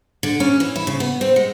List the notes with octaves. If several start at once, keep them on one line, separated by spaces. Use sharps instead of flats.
D3
C#4
E3
E4
C#3
B3
C4
G#3